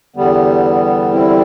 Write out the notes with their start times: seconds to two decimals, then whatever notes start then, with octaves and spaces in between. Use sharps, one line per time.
0.16 E2 D3 G3 B3
1.13 C4 E4